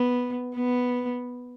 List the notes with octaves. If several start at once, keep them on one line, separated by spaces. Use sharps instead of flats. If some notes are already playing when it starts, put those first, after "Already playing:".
Already playing: B3
B3